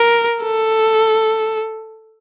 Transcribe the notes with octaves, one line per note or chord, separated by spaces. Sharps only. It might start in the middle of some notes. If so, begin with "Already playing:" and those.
Already playing: A#4
A4